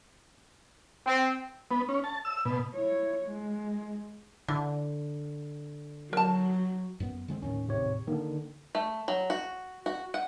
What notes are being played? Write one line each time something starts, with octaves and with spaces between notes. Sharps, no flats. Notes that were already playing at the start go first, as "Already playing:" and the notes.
C4
B3
C#4
A5
E6
B2
E4 C#5
G#3
D3 E3
F#3 A#4 A5
F#2 B3
D3 G#3 C4
D#2 A2 D#3 C#4
G#1 C3 C#5
D3 D#3 A#3
A3
F#3
F#4
F#4
F#5